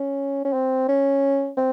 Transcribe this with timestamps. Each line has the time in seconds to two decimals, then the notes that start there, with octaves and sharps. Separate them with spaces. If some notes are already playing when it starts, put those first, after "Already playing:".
Already playing: C#4
0.45 C#4
0.53 C4
0.89 C#4
1.57 C4